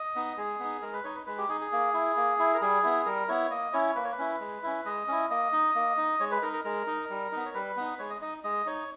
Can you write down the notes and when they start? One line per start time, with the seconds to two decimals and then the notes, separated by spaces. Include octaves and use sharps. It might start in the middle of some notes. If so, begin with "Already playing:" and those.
Already playing: D#5
0.15 B3 D#4
0.37 G#3 G#4
0.60 B3 D#4
0.82 G#3 A#4
0.93 B4
1.04 D#4 C#5
1.15 B4
1.27 G#3 B4
1.38 G4
1.49 D#4 G#4
1.61 G#4
1.72 A#3
1.94 E4
2.16 A#3
2.39 E4
2.54 A#4
2.61 G3 G#4
2.83 B3 E4
3.06 G3 A#4
3.28 B3 E4 C#5
3.51 A#3 D#5
3.73 C#4 E4 C#5
3.95 A#3 B4
4.04 C#5
4.12 B4
4.18 C#4 E4
4.40 G#3
4.63 C#4 E4
4.85 G#3 D#5
5.08 C#4 E4
5.30 A#3 D#5
5.53 D#4
5.75 A#3
5.97 D#4
6.20 G#3 C#5
6.31 B4
6.42 D#4 A#4
6.53 A#4
6.64 G#3 A#4
6.87 D#4
7.10 G3
7.32 B3 D#4
7.46 C#5
7.54 G3 B4
7.77 B3 D#4
7.99 G#3 C#5
8.10 D#5
8.21 D#4 D#5
8.44 G#3 D#5
8.66 D#4 C#5